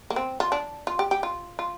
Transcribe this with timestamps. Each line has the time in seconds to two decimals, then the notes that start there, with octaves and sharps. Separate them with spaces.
0.10 A#3
0.16 C4
0.40 F4
0.52 D4
0.87 F4
0.99 G4
1.11 G4
1.23 F4
1.59 F4